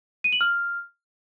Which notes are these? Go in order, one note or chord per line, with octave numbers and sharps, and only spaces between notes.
D#7
F#7
F6